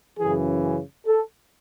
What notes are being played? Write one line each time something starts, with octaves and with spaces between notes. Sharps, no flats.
F#2 C#3 E3 G#4
A4